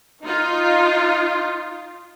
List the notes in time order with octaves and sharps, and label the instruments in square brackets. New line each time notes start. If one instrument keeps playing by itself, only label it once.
[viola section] D#4 F4